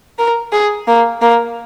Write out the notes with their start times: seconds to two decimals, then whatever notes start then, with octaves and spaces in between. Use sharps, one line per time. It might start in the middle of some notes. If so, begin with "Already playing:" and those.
0.18 A#4
0.52 G#4
0.87 A#3
1.22 A#3